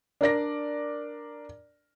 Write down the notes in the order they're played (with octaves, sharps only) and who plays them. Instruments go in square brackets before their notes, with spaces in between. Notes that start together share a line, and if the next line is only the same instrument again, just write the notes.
[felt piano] D4 A#4 D5 A#6